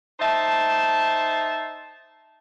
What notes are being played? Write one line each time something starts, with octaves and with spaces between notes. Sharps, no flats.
D#4 C5 E5 A5